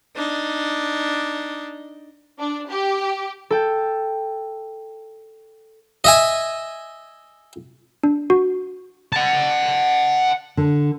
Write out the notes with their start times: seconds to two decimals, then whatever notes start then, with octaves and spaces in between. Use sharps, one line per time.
0.17 D4 D#4
2.39 D4
2.70 G4
3.50 A4 G5
6.04 D#5 E5 G#5
8.03 D4
8.30 F#4
9.13 F#5 A5
10.57 D3